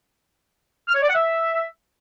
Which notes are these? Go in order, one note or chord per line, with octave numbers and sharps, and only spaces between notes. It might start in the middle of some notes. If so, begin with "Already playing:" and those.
F6
C#5
D5
F#5
E5